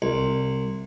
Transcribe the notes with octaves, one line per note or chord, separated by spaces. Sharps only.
C2